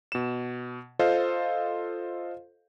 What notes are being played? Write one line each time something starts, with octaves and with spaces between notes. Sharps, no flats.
B2 E7
F4 A4 C5 D#5 F5